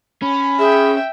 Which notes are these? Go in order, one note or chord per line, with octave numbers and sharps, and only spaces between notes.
C#4 B5
G#4 E5 G5